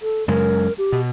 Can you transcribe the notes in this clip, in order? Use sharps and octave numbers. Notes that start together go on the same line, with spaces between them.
A4
F#2 C#3 G#3 A#4
G4
B2